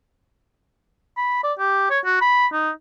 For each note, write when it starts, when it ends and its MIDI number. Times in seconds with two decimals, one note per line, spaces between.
1.17 1.44 83
1.44 1.53 74
1.59 1.88 67
1.90 1.99 73
2.05 2.19 66
2.21 2.47 83
2.53 2.70 63